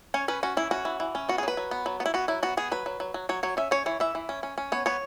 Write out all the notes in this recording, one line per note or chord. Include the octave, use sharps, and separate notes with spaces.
C#4 C#5
C#4 B4
C#4 F#4
E3 E4
C#4 F#4
E3
E3
C#4
B3 F#4
G#4
F#3 B4
F#3
B3
F#3
B3
E4
B3 F#4
F#3 E4
B3 F#4
B3 G#4
F#3 B4
F#3
F#3
F#3
F#3 C#5
F#3 C#5
C#4 E5
C#4 C#5
E3 C#5
E3 E5
E3
C#4
C#4
C#4
B3 C#5
B3 C#5